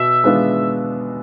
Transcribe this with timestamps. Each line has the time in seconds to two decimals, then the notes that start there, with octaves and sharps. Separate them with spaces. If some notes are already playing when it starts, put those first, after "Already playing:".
Already playing: B2 E5
0.24 G#3 B3 D4 F4